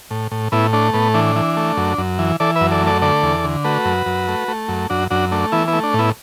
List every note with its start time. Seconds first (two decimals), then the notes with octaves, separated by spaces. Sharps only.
0.11 A2
0.31 A2
0.52 A2 B3 E4
0.73 A3 D4
0.94 A2 B3
1.14 E3 D4
1.36 E3
1.57 A3
1.77 F#2
1.98 F#2
2.19 E3
2.40 E3 A4 D5
2.55 B4 E5
2.61 F#2
2.71 A4 D5
2.82 A3 A4 D5
3.02 D3 A4 D5
3.23 E2
3.44 D3
3.64 A3 F#4 B4
3.85 F#2
4.06 F#2
4.28 A3
4.48 A3
4.68 F#2
4.90 F#2 D4 F#4
5.10 F#2 D4 F#4
5.32 A3 D4
5.52 E3 B3 E4
5.67 B3 E4
5.73 A3
5.83 D4
5.94 A2
5.99 B3 E4